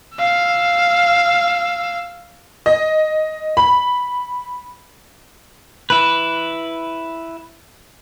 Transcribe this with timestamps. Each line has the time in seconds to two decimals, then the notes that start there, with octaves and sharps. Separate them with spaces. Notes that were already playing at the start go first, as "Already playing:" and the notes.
0.17 F5 E6
2.66 D#5
3.57 B5
5.90 E4 B4